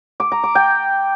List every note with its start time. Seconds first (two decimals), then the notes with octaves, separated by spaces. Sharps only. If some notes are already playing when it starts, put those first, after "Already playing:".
0.20 D6
0.32 A#5
0.43 D6
0.55 G5